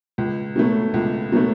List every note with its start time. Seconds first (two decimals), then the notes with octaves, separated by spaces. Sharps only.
0.18 C#2
0.56 B2 F#3 A3
0.94 C#2
1.32 B2 F#3 A3